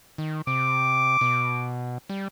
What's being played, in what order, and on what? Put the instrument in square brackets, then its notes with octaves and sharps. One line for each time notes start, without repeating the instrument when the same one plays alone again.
[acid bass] D#3
[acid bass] C3 [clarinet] D6
[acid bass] B2
G3